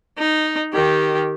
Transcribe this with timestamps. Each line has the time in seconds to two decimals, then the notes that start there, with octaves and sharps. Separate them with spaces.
0.18 D#4
0.73 D#3 G4